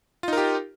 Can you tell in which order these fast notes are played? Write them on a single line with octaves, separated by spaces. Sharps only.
F4 D#4 A#4 G4